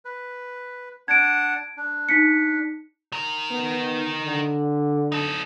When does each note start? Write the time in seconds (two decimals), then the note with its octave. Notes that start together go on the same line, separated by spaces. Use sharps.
0.05 B4
1.08 D4 F#5 A5 G#6 D7
1.77 D4
2.09 D#4 B6 C#7
3.12 D#3 A#4
3.51 B3
4.26 D3
5.12 D#4 A4